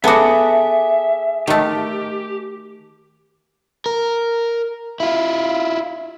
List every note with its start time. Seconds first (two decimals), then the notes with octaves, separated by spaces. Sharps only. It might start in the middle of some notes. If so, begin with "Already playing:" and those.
0.04 B3 F#4 G#4 A4 E5 D6
1.47 D#3 A3 G4
3.86 A#4
5.00 E4 F4